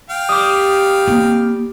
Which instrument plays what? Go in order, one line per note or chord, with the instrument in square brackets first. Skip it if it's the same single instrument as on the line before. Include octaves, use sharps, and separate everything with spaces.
[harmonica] F5 G5
[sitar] G3 [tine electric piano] D6 D#6
[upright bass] A#3 C4